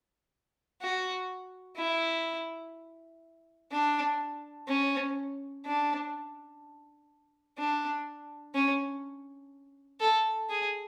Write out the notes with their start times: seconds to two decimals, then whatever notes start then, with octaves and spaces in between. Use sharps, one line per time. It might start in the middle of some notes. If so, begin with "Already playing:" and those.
0.81 F#4
1.78 E4
3.72 D4
4.68 C#4
5.66 D4
7.58 D4
8.55 C#4
10.00 A4
10.50 G#4